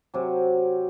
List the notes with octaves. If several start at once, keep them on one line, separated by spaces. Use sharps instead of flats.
C3 F#3